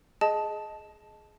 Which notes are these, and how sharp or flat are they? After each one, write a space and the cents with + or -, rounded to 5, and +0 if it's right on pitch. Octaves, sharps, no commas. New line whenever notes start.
G#4 +15 D#5 +0 A5 -10